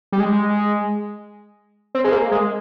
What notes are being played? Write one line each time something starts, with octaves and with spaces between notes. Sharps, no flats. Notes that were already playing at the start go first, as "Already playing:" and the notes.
G3
G#3
C4
G#3
A#3
G#3